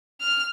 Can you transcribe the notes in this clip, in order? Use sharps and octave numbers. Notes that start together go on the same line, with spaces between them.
F6